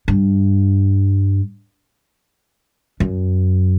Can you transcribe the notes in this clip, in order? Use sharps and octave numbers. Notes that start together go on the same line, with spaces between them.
G2
F#2